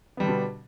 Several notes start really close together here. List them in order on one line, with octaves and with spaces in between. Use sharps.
B3 G3 D3 D4 B2